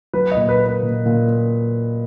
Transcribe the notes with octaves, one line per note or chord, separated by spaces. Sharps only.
F#3 B4
D#5
A#2
B4
A#3
B4
A#2
A#2